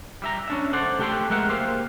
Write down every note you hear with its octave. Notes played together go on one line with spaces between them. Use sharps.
G3 E5 A#5
C#4 D4 E5
A4 C5 D5 F#5
A3 G4 A4 F#5 G5 C6
G#3 A3 A#4 E5 F#5
A#3 G4 C5 F5